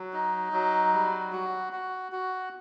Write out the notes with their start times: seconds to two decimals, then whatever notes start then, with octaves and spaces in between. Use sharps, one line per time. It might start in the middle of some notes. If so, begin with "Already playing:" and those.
Already playing: F#3
0.13 D#4
0.53 F#3
0.93 G3
1.32 F#4
1.73 F#4
2.12 F#4